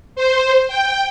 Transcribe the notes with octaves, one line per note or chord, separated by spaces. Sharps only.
C5
G5